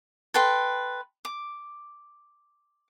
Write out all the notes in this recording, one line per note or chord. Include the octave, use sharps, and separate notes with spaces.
A4 B4 G5 C6
D6